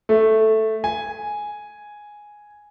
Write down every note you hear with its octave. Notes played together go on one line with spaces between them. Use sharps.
A3
G#5